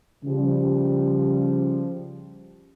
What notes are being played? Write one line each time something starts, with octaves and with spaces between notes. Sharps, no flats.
C#3 F3 G3